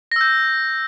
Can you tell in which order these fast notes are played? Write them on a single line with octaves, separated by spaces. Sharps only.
A#6 E6 G6